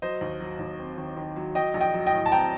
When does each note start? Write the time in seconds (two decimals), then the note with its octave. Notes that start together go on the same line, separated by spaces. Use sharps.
0.02 F#3 C5 D#5
0.21 D#2
0.40 F#3
0.59 D#2
0.79 C4
0.97 D#3
1.17 D#3
1.36 F#3
1.55 F#3 D#5 G5
1.74 A#1
1.81 D#5 G5
1.94 F#3
2.06 D#5 G5
2.13 A2
2.26 A5
2.31 C4 G5 A#5